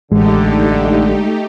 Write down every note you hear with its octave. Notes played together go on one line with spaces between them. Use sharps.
A1 D3 G#3 A3 D#4 G4